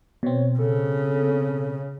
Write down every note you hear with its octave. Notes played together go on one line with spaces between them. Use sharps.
B2 C4 C#5
C#3 A4